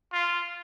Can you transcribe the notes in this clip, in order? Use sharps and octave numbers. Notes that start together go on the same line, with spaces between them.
F4